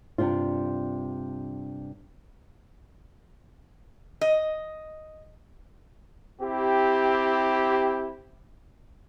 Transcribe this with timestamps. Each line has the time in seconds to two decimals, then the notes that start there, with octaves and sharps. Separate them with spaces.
0.18 G2 C3 D4 F4
4.21 D#5
6.41 C4 E4 G4